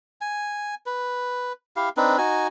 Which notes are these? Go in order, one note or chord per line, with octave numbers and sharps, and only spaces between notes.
G#5
B4
E4 G4 F5
C4 D4 D#4 B4
D#4 F#4 G#5